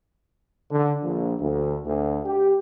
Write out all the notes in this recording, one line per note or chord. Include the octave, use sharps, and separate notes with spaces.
D3
A#1
D2
D2
G4